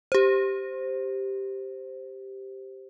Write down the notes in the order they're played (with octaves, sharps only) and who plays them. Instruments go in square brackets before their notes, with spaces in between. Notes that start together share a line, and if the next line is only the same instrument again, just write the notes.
[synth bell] G4 C5